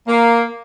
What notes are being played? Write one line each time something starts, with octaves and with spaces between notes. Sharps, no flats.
A#3